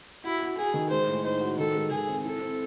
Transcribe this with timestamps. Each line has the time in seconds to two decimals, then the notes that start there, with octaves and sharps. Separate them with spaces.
0.24 E4 F#4
0.41 F#4
0.57 F#4 G#4
0.74 D#3
0.90 G#3 C5
1.07 A2
1.24 D#4 C5
1.40 F#4
1.58 D#3 A4
1.75 G#3
1.90 D#3 G#4
2.08 C4
2.25 E4 A4
2.41 C4